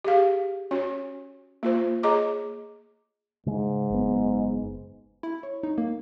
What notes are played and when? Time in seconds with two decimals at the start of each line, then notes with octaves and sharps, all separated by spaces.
0.04 G4 G#4 F5
0.71 C#4 F#4 C#5
1.63 A#3 F4 C5
2.03 G#4 C#5 D#5 A#5 D6
3.46 G#2 C#3 G#3
3.90 F#1 B3
5.23 E4
5.43 C#5
5.63 D#4
5.78 A#3